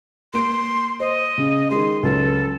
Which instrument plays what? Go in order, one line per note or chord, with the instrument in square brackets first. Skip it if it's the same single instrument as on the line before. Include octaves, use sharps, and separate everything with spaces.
[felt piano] A#3 D7 [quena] C6
[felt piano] C5 [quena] D#5
[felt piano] C#3
[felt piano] D#3 G#3 [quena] C6
[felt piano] C#2 F#3 [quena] A4